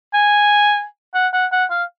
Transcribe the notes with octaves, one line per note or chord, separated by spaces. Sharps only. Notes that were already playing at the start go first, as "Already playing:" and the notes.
G#5
F#5
F#5
F#5
F5